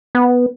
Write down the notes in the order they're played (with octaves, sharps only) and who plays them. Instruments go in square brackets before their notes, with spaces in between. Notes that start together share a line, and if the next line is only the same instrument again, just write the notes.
[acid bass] B3